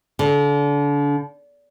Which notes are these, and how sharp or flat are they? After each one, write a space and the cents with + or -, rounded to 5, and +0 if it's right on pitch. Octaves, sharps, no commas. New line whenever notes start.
D3 -35